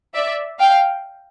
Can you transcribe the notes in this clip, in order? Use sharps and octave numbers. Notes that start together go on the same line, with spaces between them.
D5 E5
F5 G5